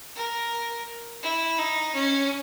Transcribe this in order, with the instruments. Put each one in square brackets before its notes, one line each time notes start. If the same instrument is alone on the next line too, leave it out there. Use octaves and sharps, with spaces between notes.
[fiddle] A#4
E4
D#4
C#4